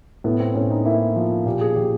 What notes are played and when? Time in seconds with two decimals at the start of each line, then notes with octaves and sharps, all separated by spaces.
0.24 A2 B3
0.40 C4
0.55 A2 C#4
0.70 D#4
0.85 A#3 E4
1.16 F3
1.46 A#2 G4
1.61 G#4
1.76 F3 G4